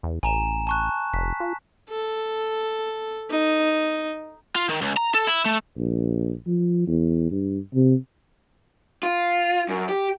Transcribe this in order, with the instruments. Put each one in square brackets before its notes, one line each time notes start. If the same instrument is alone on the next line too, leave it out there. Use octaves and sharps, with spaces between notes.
[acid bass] E2
[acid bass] A1 [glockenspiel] G#5 A#5 E7
[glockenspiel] A5 C#6 F#6
[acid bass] F1 [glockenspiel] B6
[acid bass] F4
[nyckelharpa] A4
D#4
[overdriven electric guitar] F4
D#3
C#2
A#5
A4
E4
A3
[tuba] A#1
F3
E2
G2
C3
[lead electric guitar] F4
F#2
G4